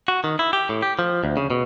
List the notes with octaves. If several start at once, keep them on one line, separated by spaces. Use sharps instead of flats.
F#4
D#3
E4
G4
A2
G4
F3
D2
C#3
B2